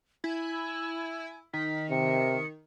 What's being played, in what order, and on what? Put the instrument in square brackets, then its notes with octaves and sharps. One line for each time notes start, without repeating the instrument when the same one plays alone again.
[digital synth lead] E4 [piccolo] G#5
[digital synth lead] D#3 [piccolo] B6
[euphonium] C3 [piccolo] C#7